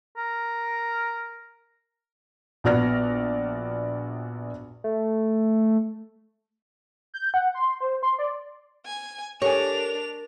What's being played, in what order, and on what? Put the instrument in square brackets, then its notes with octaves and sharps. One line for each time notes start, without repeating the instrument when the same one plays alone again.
[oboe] A#4
[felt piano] A#1 B3 F#4 D5 F6 A#6
[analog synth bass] A3
[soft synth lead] G6
F#5
C6
C5
C6
D5
[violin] G#5
[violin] D4 F7 [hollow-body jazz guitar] G4 A4 G#5 [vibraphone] A#4 [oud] C#5